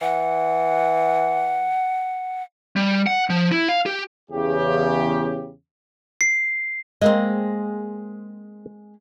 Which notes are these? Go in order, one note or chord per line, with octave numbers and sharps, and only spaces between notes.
E3 F#5
G3
F#5
F3
E4
F5
G4
E2 C#3 G4
C7
G#3 A#3 C4 D#5